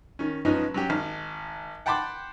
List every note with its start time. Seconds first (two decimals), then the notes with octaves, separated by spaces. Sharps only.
0.19 D#3 C#4
0.45 G#2 F3 B3 C#4 D#4
0.74 F#3 C#4 G4
0.89 G#1 F6
1.86 F#5 G5 A5 B5 C6 D6